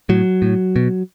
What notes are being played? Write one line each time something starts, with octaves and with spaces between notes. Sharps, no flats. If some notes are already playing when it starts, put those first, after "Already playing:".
A2 F#3
A2
B2